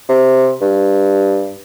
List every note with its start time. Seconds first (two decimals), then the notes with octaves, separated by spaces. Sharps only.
0.09 C3
0.62 G2